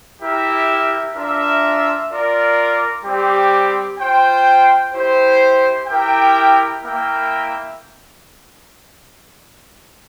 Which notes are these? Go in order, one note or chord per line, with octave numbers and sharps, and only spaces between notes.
E4 G4 A#4 E5
D4 F4 A#4 E5
F4 A#4 D5
G3 C4 G4
F4 C5 G5
E4 G4 C5
E4 G4 A#4 E5 G5
A#3 E4 A#4 E5 G5